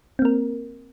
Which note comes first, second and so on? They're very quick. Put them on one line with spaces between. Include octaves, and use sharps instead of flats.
C4 A#3 A#4